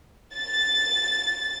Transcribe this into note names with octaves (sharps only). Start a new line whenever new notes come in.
A6